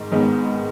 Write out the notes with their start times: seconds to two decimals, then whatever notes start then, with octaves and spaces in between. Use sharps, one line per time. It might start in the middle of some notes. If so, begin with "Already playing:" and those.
Already playing: G#2 D#3 G#3
0.12 G#2 D#3 G#3 B3